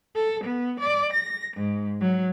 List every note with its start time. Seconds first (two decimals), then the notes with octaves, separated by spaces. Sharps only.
0.13 A4
0.43 B3
0.80 D5
1.13 A#6
1.56 G#2
2.00 F#3